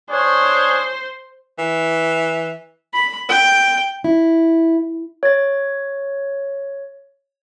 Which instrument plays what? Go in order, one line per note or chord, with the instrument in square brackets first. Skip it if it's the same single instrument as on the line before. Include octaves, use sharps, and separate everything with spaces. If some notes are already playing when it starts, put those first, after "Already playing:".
[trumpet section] D4 G#4 C#5 [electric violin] C5
[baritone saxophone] E3
[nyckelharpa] B5
G5
[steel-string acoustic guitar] E4
[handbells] C#5 A6